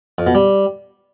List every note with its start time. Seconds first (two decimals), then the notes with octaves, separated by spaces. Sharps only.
0.18 F2
0.27 B2
0.35 G3